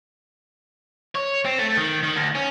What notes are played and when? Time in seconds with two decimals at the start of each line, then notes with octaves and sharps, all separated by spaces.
1.15 C#5
1.45 C4
1.59 A3
1.77 D#3
2.03 D#3
2.16 D2
2.35 C#4